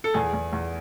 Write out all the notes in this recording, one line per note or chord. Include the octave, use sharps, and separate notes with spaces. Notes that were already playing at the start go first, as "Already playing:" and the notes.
A4
E2 G#4
E2
E2